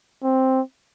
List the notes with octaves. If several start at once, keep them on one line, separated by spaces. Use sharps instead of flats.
C4